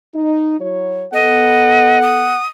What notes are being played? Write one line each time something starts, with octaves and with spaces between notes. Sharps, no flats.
D#4
F#3 E4 C#5
B3 A4 D#5 F#5
D#6